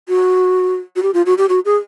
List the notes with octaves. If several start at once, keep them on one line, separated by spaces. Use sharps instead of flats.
F#4
F#4
G4
F4
F#4
G4
F#4
G#4